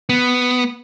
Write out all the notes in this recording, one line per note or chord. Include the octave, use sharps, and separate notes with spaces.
B3